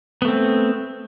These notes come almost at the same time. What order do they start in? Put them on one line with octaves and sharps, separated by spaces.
B3 A3 C4